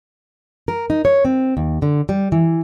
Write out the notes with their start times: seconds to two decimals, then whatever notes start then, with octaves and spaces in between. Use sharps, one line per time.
0.68 A#4
0.90 D#4
1.05 C#5
1.25 C4
1.57 D#2
1.82 D3
2.09 G3
2.32 E3